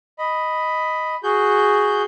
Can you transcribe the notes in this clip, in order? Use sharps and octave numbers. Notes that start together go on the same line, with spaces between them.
D#5 B5
F#4 G#4 G6